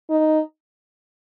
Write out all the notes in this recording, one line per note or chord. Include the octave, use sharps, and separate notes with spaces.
D#4